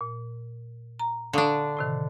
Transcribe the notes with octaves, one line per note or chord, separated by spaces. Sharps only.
A#2
A#5
D3 D4 F5 C#6 D#6
A2 C3 D#3